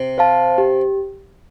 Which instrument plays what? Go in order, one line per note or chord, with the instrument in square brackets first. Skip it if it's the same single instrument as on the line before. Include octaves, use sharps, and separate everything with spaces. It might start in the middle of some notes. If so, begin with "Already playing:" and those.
Already playing: [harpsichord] C3
[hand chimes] C5 F5 A5
G4